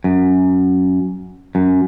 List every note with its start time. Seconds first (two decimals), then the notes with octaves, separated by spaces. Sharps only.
0.04 F#2
1.55 F#2